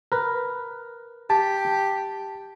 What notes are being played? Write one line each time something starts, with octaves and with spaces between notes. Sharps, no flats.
A#4 B4
G4 A5